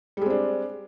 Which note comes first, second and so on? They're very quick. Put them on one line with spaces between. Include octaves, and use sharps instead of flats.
G3 G#3 C4 D4